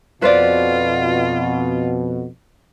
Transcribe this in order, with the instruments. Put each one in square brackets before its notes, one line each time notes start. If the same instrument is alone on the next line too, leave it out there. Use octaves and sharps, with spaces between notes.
[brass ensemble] F2 B2 [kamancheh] F4 [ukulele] B4 C5 D5